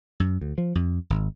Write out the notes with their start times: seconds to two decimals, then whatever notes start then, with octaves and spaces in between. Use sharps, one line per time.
0.20 F#2
0.41 D2
0.58 F3
0.75 F2
1.10 G#1